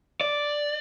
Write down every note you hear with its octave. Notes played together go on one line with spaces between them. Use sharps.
D5